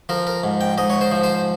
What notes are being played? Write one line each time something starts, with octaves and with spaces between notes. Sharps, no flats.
F3 A#4
A#4
G#2
G5
G#2 D#5
C#5
C5
F3
C5